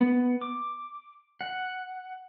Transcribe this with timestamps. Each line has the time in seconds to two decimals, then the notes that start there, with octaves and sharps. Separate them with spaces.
0.01 B3
0.41 D6
1.41 F#5